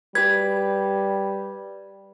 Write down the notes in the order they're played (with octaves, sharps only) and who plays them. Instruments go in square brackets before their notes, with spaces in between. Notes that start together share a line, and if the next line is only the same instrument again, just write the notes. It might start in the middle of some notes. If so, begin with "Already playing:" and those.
[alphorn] G3 [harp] G4 B4 [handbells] G#6